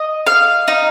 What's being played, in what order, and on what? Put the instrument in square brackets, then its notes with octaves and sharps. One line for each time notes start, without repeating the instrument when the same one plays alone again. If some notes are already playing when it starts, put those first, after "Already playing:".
Already playing: [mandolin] D#5
F5
D#4